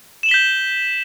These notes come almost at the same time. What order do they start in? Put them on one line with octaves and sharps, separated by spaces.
E7 F#7 G7 B6 G6